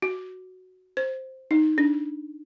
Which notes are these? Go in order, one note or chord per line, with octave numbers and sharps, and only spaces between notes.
F#4
C5
D#4
D4